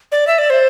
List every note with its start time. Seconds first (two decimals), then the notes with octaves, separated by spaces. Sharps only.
0.12 D5
0.27 E5
0.39 D5
0.50 C5